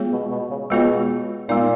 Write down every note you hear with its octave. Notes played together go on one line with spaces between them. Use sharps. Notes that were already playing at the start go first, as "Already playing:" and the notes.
Already playing: G#3 B3 F4 G#4 C#5
B2
B2
C#3
B2 G#3 B3 F4 G#4 C#5
A#2 G#3 B3 D#4